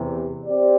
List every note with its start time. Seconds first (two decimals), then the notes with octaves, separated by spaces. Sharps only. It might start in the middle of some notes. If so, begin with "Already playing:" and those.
Already playing: E2 C3 E3
0.46 C4 G4 D5